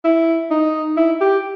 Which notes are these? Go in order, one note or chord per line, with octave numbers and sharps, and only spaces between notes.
E4
D#4
E4
G4